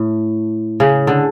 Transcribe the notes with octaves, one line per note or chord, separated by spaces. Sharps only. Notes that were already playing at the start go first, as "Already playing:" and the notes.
Already playing: A2
C#3
D3